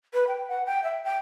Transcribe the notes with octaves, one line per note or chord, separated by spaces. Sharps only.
B4
G5
F#5
G5
E5
G5